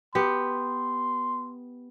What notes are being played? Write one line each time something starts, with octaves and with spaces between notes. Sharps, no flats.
B3 G4 C6